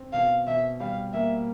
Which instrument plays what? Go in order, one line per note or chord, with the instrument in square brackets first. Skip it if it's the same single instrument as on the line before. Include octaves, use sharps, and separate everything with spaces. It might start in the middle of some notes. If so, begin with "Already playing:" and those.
Already playing: [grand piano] C4
[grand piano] B2 [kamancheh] F5
[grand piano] B2 [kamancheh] E5
[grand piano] G3 [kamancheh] F5
[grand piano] A#3 [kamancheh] E5